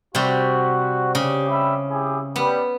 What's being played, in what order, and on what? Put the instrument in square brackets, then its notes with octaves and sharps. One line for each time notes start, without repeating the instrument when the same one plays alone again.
[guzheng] C3 G3 [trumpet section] F#4
[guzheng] C#3 [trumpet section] G4
[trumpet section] G3 E5 B5
E4 G4 G#4
[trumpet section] G3 [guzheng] B3